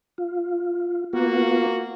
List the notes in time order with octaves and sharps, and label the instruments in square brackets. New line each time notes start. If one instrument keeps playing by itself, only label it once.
[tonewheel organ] F4
[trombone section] A#3 F#4 [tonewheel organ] B3 F4